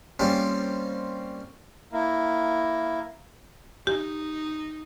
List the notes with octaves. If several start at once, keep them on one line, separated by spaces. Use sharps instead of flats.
G3 A#3 C4 C#4 F4
A#3 E4
D#4 G4